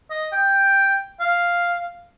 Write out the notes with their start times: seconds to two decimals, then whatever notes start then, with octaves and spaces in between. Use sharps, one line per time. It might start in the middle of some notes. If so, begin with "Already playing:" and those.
0.10 D#5
0.32 G5
1.20 F5